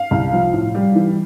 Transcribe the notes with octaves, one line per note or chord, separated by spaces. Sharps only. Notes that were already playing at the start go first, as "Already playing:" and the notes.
Already playing: F5
C2
F3
A2
G3
E3